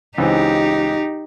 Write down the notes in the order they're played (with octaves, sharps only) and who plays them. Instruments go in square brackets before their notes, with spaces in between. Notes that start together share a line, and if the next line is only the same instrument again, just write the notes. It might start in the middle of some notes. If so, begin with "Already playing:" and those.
[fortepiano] C#2 E3 C4 [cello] D#4 G4